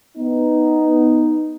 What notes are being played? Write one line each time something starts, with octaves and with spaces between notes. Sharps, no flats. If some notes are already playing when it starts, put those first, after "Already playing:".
B3 D#4